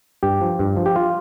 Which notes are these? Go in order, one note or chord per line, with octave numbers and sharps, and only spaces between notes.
G2 G4
F3
G2
F3
G4
F4